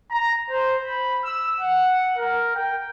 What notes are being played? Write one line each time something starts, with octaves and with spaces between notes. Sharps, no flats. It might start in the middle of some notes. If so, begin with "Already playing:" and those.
A#5
C5
B5
E6
F#5
A#4
G5